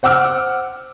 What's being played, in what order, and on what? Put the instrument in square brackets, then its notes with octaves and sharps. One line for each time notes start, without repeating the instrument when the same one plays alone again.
[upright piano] C5 F#5 D6 E6 F6